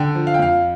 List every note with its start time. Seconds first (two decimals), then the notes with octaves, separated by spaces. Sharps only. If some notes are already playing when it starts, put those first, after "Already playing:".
Already playing: D3 G5
0.15 F3
0.27 F5
0.34 G5
0.39 F2 F5